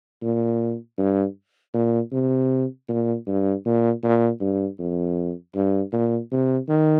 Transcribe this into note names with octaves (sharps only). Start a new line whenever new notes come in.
A#2
G2
A#2
C3
A#2
G2
A#2
A#2
G2
F2
G2
A#2
C3
D#3